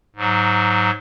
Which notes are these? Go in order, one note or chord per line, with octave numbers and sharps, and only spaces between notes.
G#2 F#3